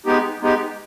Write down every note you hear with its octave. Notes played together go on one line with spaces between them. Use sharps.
G#3 B3 D#4 G4
G#3 B3 D#4 G4